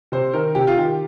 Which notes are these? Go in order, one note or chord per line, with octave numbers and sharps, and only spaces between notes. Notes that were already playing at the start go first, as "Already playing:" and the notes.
C3 C5
D#3 A#4
C3 G4
F4
D#3 G4